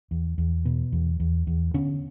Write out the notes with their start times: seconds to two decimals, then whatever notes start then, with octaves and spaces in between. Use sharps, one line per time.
0.11 E2
0.38 E2
0.65 B2
0.92 E2
1.20 E2
1.47 E2
1.74 D3 B3 C#4